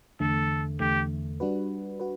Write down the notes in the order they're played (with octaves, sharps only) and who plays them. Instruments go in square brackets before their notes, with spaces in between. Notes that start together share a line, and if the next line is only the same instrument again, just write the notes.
[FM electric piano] E2 D3 A3 [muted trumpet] A4
[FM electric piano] E2 D3 A3 [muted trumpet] G4
[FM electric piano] G3 D4 F#4 B4
F#4 B4